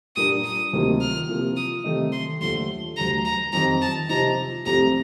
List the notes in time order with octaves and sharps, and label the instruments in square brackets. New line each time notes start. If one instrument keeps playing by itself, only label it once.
[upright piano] A#2 G3 A#3 D4 [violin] D#6
[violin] D#6
[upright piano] D2 C3 D#3 A#3 F4
[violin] F6
[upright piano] C3 F3 A#3 F4
[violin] D#6
[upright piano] C3 D#3 A3 D#4
[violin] C6
[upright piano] D#2 D3 F3 A3 [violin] C6
[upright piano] D2 D3 G3 [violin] A#5
[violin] A#5
[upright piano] F2 D#3 G3 [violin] A#5
[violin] A5
[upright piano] C3 F3 C4 D#4 [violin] A#5
[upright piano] C2 C3 F3 A3 [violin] A#5